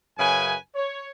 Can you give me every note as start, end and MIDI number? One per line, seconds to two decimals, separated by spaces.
0.18 0.54 42
0.18 0.54 49
0.18 0.54 71
0.18 0.54 80
0.75 1.09 73